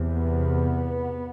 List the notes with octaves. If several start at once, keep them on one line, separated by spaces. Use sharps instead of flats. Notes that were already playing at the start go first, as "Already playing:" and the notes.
Already playing: E2 C3
B3